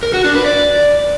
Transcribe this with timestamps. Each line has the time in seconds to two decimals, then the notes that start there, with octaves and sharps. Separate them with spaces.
0.03 A#4
0.14 F#4
0.24 D4
0.35 B4
0.46 D5